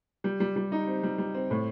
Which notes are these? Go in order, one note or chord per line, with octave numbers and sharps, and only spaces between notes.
G3
G3
G3
D#4
C4
G3
G3
C4
A2